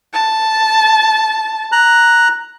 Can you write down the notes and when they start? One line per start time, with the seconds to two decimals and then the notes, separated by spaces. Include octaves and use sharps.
0.13 A5
1.72 A#5 F#6